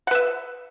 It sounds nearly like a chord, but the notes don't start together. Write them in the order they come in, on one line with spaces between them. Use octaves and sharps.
F#5 B4 E5